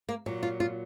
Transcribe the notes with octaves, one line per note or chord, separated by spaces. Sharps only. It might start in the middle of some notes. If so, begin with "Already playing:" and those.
A#3
A#2 F#3
F4
F4